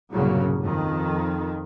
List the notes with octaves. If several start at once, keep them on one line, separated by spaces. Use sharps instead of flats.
C2 G2 A#2 C#3 F#3 A#3
F2 D#3